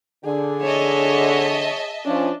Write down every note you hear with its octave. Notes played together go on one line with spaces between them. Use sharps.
D3 G#4
C#5 D#5 E5 A5
F3 C#4 D4